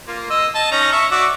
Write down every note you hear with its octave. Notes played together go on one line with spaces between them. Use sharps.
A#3 F4
D#5 E6
D#5 A5
C#4 D#4 A#5
E5 C#6
F#4 D5 E5